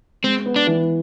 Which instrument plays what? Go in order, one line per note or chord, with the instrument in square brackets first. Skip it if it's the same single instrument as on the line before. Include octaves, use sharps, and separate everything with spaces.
[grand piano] G#3 [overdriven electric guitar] C4
[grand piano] B3
[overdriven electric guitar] D4
[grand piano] E3